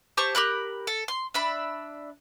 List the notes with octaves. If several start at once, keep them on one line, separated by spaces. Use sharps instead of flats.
G4 C5 A5 C#6
G4 A#4 B5 F#6
A4
C6
D4 E5 B5